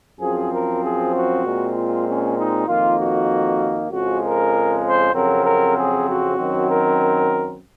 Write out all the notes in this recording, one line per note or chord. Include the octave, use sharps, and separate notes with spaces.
F#2 F3 C4 G#4
A#4
G#4
F#4
A#2 G#3 C4
F4
C#4
D#4
F2 D#3 A#3 F4
F#4
F2 C#3 F3 G#3 F#4
A#4
C5
F2 C#3 F#3 C4 A#4
A#4
G#4
F#4
F#2 D#3 F#3 C4
A#4